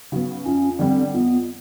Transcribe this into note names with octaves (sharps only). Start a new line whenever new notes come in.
C#3 F#3 B3
F2 C#4
D3 G3 C4
F2 B3